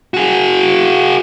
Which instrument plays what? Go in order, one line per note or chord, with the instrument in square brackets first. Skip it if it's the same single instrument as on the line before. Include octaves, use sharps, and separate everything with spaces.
[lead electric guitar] F#4 G#4